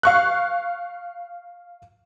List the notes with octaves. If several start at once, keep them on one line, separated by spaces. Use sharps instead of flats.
F5 C#6 F#6